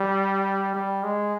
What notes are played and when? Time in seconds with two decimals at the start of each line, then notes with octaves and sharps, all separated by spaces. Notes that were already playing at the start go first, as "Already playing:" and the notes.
Already playing: G3
0.75 G3
1.03 G#3